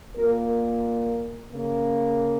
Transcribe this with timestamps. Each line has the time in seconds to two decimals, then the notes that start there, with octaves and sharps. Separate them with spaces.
0.16 A#2 A#3 A#4
1.51 C#3 A#3